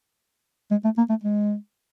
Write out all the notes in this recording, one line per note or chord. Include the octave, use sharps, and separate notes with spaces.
G#3
A3
A#3
A3
G#3